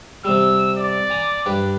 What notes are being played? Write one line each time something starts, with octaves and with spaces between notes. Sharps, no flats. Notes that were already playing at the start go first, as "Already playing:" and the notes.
C3 G3 E6
D5
G#5 A#5
G2 G4 B4